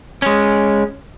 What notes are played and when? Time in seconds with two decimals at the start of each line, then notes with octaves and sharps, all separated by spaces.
0.22 G#3 C#4